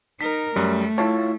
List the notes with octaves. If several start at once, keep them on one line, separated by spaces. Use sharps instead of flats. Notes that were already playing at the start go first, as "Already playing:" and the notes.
D#4 A#4 B6
F#2 G3 A3
E4 F4 C#5 A5